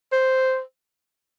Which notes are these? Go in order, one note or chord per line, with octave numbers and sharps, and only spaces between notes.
C5